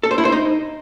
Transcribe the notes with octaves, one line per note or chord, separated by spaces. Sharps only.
A4
C5
E4
C5
D#4